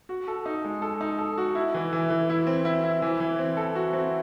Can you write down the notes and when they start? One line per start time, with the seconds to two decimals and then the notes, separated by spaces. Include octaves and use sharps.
0.09 F#4
0.28 A4
0.46 D#4
0.65 G#3
0.82 A4
1.01 D#4
1.18 A4
1.38 F#4
1.55 E4
1.74 E3
1.93 E3
2.10 E3
2.30 E4
2.47 C4
2.65 E4
2.84 E4
3.02 E3
3.20 E3
3.39 C4
3.57 A4
3.75 F#4
3.93 C4